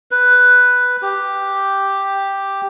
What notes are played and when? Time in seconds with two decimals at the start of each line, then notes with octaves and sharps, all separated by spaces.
0.11 B4
1.02 G4